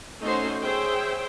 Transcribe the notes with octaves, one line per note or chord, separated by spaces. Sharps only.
A3 C#4 D#4 F#4 C5 C6
G#4 C5 C#5 E5 G5